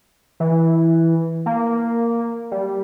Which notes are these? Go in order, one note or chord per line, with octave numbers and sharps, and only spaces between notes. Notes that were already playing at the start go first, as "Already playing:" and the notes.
E3
A#3
G3